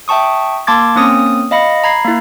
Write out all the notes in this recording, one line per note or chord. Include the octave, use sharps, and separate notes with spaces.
E5 G5 A5 C#6 D#6
A#3 A5 C6 D6 G#6 A6
A#3 C4 C#4 D#6
D#5 F5 B5 A#6 C#7
A#5 B5 G#6 C7
A#3 E4